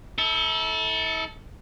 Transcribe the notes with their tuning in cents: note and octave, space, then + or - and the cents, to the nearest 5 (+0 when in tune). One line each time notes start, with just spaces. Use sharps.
E4 -45 A4 +0